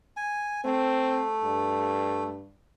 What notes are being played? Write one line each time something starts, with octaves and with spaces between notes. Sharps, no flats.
G#5
A3 C4
G2